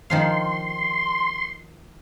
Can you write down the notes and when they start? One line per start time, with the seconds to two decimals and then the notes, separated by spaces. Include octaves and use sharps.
0.10 D#3 F3 F5 C6